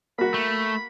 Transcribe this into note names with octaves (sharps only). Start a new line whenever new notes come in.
A#3 F#4 B5
A3